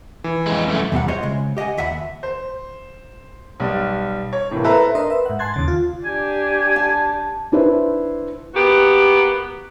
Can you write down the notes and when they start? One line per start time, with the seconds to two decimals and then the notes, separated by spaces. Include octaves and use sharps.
0.24 E3
0.47 F2 G#3
0.68 F#2 A3
0.92 E2 C3 G3 F#5
1.08 F4 G#4 C5 C#5 D#5 E5
1.23 C#3 G#3
1.57 G4 D#5 E5 F#5 G#5
1.77 D#2 E5 F#5 G#5 B5
2.23 C5
3.60 B1 G3
4.33 C#5
4.51 A2 C3 E3 A#3
4.64 E4 A4 B4 C5 E5 A#5
4.95 D4 A#4 D#5 C6
5.10 B4 E5
5.26 G#2 F#5
5.39 G#5 A5 C6 F#6 G#6 A6
5.54 D#2 C#3 A6
5.68 F4
6.05 D4 G4 G#5
6.76 A5
7.52 D4 E4 B4 C5
8.55 A#3 B3 F#4 G4